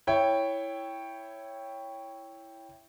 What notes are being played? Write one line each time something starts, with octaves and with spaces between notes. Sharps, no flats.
E4 C#5 G5